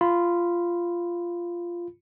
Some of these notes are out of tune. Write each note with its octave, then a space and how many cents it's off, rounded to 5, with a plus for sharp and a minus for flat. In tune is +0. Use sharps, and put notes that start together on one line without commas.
F4 -10 B5 +0